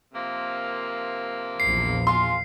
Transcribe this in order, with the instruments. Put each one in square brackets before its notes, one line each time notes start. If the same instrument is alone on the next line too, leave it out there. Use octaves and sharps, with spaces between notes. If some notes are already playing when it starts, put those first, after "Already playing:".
[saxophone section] C3 F3 A#3
[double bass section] A#1 E2 [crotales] C7
[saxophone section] G#3 F4 F5 [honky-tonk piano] C6